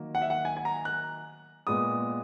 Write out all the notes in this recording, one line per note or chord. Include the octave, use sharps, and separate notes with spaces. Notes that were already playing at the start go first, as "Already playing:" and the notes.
Already playing: D#3 F#3 A#3
F#5
E5
F#5
G#5
G#5
A#5
F#6
A#2 G#3 B3 D#6